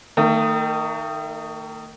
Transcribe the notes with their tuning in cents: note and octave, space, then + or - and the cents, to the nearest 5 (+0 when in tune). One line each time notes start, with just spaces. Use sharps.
D#3 -5 A3 +40